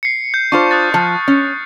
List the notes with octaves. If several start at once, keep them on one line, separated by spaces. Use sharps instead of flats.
C7 C#7
G6
D4 F4 C5 C#6 F6
D#6 F#6 A6
F3
C#4